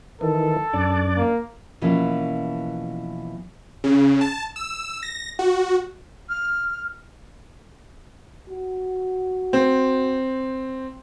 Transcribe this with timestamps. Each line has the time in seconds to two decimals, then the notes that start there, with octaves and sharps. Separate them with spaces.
0.21 D#3 E3 A4
0.73 F#2 D4 D5
1.17 A#3
1.81 B2 E3 F3 A#3 C#4
3.84 C#3
4.21 A5
4.56 E6
5.03 A#6
5.39 F#4
6.29 F6
8.50 F#4
9.53 C4